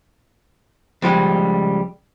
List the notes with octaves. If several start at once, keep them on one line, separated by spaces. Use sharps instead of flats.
C#2 F3 G3 G#3